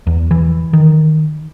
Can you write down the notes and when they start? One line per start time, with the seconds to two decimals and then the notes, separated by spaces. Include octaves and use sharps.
0.07 E2
0.31 E3
0.73 D#3